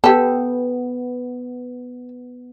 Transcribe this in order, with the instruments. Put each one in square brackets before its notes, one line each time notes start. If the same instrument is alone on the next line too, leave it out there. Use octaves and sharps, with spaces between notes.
[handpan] B3 [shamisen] G4 A4